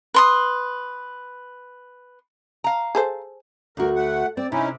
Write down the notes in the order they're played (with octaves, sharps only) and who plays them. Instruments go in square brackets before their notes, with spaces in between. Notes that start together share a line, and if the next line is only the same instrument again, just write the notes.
[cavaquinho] B4 C6 D#6
[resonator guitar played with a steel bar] F5 A#5
[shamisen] G#4 A4 C5
[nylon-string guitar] D2 F#4 [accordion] A#4
[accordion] A3 F#5
[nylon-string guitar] C4 [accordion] D5
[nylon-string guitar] C3 [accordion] C#4 D#4 E4